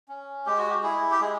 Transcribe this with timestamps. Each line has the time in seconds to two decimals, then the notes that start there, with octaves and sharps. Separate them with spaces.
0.08 C#4
0.46 G#3 G4
0.58 F#4
0.70 G4
0.83 E4 G#4
1.11 G4
1.21 G#3 G#4